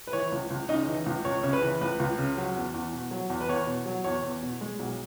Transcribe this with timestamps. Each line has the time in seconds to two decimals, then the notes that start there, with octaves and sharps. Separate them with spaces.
0.07 B4
0.13 E3 C#5
0.32 C#2
0.50 C#2
0.69 C#3 D#4 D#5
0.87 E3
1.06 C#2
1.25 C#2 C#5
1.43 C#3 C#5
1.53 B4
1.62 E3
1.81 C#2 B4
2.00 C#2
2.18 C#3
2.38 F#3
2.56 E2
2.74 E2
2.93 B2
3.11 F#3
3.30 E2
3.41 B4
3.49 E2 C#5
3.67 B2
3.86 F#3
4.04 E2 C#5
4.23 E2
4.43 B2
4.61 G#3
4.79 B1